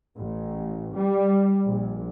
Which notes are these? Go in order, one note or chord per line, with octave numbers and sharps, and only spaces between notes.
A1
G3
A#1